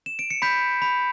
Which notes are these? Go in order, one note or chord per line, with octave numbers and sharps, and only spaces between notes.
E7
D7
C#7
B5 G6 B6
B5